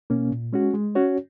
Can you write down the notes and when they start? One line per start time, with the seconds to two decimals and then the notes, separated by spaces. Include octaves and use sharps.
0.10 B2 A#3 C#4
0.32 A#2
0.53 G#3 C#4 F#4
0.74 G#3
0.95 C#4 F#4 C#5